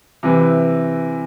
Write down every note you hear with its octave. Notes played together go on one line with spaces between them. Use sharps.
C3 E3 E4
E4